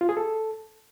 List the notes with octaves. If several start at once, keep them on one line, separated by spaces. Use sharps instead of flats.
F4
G#4
A4